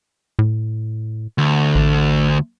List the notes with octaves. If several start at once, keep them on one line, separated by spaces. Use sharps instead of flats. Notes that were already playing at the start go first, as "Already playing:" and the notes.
A2
D2
A1